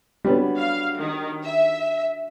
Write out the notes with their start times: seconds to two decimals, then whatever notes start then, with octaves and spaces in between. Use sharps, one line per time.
0.25 G3 B3 D4 F#4 C#5
0.58 F5
0.98 D#3
1.43 E5